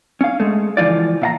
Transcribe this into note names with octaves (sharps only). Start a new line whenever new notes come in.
C#4 F5
G#3 A3
C#2 E3 F3 F4 D5
A#2 F5 A#5